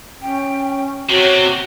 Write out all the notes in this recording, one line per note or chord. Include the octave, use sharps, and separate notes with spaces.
C#4 G5
C3 F#4 C#5